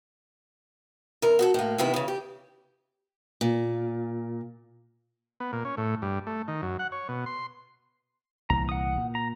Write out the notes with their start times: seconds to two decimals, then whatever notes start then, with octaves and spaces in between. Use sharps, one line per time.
1.22 E2 A#4
1.39 F#4 G4 A4
1.54 A2 A#3
1.78 C3 D#3 E3 B3 E4
1.94 E2 C#3
2.08 G4
3.41 A#2
5.40 B3
5.53 A#2
5.65 C#4
5.77 A2
6.02 G2
6.27 A3
6.48 D#3
6.62 F#2
6.79 F#5
6.92 C#5
7.09 B2
7.26 C6
8.50 C2 A#2 E3 A#5
8.69 F#5 D#6
8.98 A#2
9.15 A#5